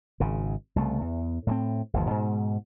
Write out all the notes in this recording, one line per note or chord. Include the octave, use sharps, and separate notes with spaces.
G#1 C#3
C2 C#3 A3
E2
A2 G3 C4
G1 D#2 F3
G#2 B2